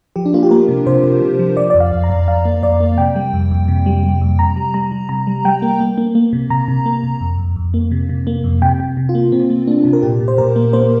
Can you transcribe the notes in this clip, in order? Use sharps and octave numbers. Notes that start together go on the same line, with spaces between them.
F3 G4
D4
A#3 F4
G4
A#3 A#4
C3
C3 C5
C3
C3
F3
F3 D5
F2 D5
F5
F2
A#5
F2
F2 F5
A#3
F2 D5
A#3
C3 G5
G3
F2
F2
C3
G3
G3
F2
C3 A#5
G3
G3 A#5
G3
C3 A#5
G3
G3 G5
A#3
A#3
A#3
A#3
C3
C3 A#5
C3
A#3
C3
F2
F2
F2
A#3
C3
C3
A#3
F2
C3 G5
C3
C3
F4
A#3
C3 C4
A#3
A#3 D4
C3
A#4
A#2 G4
A#2
C5
A#2 A#4
A#3
A#3 C5